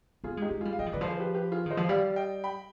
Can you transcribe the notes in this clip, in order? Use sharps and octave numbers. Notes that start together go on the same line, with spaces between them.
B3 F4 G#4
G#3
D#4 G4
G#3
G3 F4 G#4
F5
G3 D#5 G5
F3
D#3 B4 D5
F3
G#4 C5
G4 B4
G4 B4
F4 G#4
D#3 C5 D#5
F3
G3 D5 F5
D#5 G5
G5 B5